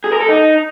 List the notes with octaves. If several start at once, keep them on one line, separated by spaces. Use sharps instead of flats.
G#4
A#4
A4
D#4